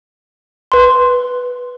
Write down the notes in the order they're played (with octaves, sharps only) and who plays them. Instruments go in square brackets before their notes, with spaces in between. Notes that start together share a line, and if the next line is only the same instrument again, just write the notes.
[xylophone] B4 C6